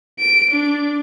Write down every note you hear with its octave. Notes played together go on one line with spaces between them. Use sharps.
D7
D4